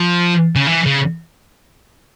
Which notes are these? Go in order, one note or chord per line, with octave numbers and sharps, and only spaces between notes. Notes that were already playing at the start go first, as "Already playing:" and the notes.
Already playing: F3
C#3
E3
C#3